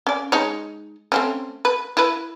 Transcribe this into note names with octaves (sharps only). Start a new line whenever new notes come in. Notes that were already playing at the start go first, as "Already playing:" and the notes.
C#4 D5
G#3 D#4 C#5
A3 C4 C#4
B4
E4 B4